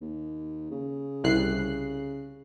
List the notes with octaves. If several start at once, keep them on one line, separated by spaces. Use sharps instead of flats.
D#2
C#3
C2 F#6 C7